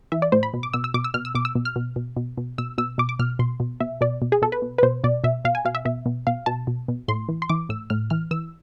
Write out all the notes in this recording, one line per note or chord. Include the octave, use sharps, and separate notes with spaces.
E3 E5
D5
A2 C5
B5
B2
D6
B2 E6
E6
B2 D6
E6
B2 F6
E6
B2 D6
E6
B2
F6
B2
B2
B2
B2
B2 E6
B2 E6
B2 D6
D6
B2 F6
B2 C6
B2
B2 E5
B2 D5
B2
G#4
B2 A4
B4
B2
B4
B2 C5
B2 D5
B2 E5
B2 F5
G#5
B2 F5
E5
B2 E5
B2
B2 F5
B2 A5
B2
B2
A2 C6
E3
C6
E3 D6
A2 E6
A2 F6
E3 F6
E3 E6